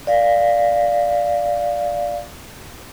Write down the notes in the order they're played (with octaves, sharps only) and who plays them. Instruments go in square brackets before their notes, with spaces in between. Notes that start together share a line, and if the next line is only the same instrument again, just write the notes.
[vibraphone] D5 F5